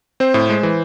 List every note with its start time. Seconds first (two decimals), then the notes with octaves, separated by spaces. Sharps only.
0.20 C4 C5
0.34 A2
0.50 G#3
0.63 E3